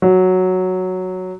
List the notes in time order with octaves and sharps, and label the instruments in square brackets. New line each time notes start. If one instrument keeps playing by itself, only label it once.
[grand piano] F#3